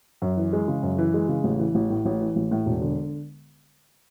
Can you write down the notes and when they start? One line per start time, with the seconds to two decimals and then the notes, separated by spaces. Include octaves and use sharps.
0.22 F#2
0.37 E3
0.53 G#3
0.68 C#3
0.83 F#2
0.98 E3
1.14 G#3
1.29 C#3
1.44 A1
1.59 E3
1.75 A1
1.90 A2
2.05 A1
2.20 E3
2.36 A1
2.51 A2
2.66 E1
2.81 D3